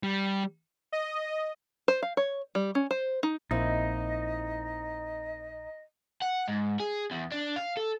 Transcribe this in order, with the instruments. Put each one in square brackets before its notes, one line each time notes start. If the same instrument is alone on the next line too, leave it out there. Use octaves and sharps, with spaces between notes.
[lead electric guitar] G3
[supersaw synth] D#5
[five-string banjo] C5
F5
C#5
G3
C#4
C5
D#4
[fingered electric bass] A#1 [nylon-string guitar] A#3 C4 E4 [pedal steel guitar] D#4 [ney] D#5
[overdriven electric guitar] F#5
G#2
G#4
E2
D4
F5
A4